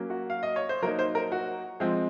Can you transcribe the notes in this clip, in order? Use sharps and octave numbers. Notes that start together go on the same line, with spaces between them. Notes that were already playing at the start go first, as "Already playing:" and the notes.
Already playing: F#3 A#3 C#4
F#4
F5
D#5
C#5
C5
F#3 A#3 D#4 A#4
C5
A#4
F#4
F3 G#3 C4